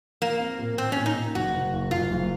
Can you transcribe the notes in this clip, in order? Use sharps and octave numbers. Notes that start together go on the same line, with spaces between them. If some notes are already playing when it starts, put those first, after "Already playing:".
F3 A#3
C4
A#2
A#2 C4
A#2 C#4
D#4
A#2
F#1 F#4
F#1
F#1
F#1 F4
F#1